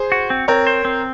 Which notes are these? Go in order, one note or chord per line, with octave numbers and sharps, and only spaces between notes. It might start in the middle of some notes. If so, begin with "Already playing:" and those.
Already playing: G#4 C5
F#4
C4
C4 A#4 C#5
C5
C4